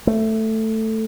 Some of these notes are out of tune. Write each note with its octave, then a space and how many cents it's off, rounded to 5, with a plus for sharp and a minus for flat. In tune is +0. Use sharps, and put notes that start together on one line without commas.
A3 +5